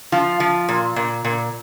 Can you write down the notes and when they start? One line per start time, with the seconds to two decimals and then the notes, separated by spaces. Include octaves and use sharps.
0.12 F3 F4
0.40 F3
0.69 A#2
0.96 A#2
1.25 A#2